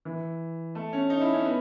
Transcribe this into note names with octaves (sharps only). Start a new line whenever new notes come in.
E3
A3
C#4
D#4
E4
C#4
B3